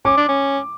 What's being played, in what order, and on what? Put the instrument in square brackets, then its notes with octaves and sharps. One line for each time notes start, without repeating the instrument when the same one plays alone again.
[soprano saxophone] C#4 [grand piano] D6
[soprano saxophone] D4
C#4